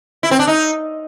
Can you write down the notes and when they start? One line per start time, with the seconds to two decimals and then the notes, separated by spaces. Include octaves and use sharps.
0.23 E4
0.31 C4
0.39 D4
0.47 D#4